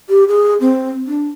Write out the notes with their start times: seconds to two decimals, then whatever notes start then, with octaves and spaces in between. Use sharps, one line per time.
0.09 G4
0.28 G#4
0.61 C4
1.07 D4